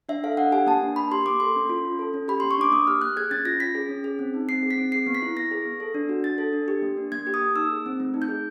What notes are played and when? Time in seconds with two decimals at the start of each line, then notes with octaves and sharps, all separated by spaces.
0.09 D4 E5
0.24 A4 F5
0.37 D4 F#5
0.52 G4 G#5
0.67 A#3 A5
0.82 D4
0.96 A#3 B5
1.11 G4 C6
1.26 A#3 D6
1.40 A4 C6
1.56 C#4
1.69 F4
1.85 C#4
1.99 A4
2.14 C#4
2.28 G4 B5
2.40 C6
2.43 A#3
2.51 C#6
2.58 D4 D6
2.72 A#3 D#6
2.87 G4 F6
3.01 A#3 F#6
3.17 G#4 G#6
3.31 C#4 A6
3.45 F4 A#6
3.60 C#4 B6
3.75 G#4
3.89 C#4
4.04 G#4
4.19 C4
4.34 D#4
4.48 C4 C7
4.63 G#4
4.71 B6
4.78 C4
4.92 G#4 C7
5.07 B3
5.15 B6
5.22 E4
5.36 B3 A#6
5.51 G#4
5.65 B3
5.80 A4
5.94 D4
6.09 F#4
6.24 D4 A6
6.38 A4
6.53 D4
6.68 G4
6.82 A#3
6.97 D4
7.12 A#3 G#6
7.27 G4
7.34 D#6
7.42 A#3
7.56 D#4 E6
7.71 G#4
7.86 C4
8.00 A3
8.14 D#4
8.22 G6
8.29 G#4